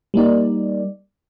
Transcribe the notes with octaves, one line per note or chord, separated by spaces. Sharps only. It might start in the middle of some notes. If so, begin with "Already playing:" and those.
G3 A#3 D#4 D5